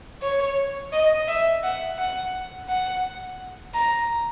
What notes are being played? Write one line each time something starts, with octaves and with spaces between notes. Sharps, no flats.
C#5
D#5
E5
F#5
F#5
F#5
A#5